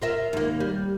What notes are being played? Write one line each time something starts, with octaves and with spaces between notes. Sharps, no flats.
F4 A#4 E5
D#2 A#3
G3